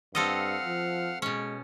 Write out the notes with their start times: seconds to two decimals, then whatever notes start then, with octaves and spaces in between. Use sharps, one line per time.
0.15 G2 C4 A4 D#5 F5 F#5 F6
0.65 F3
1.22 B2 G#3 C#4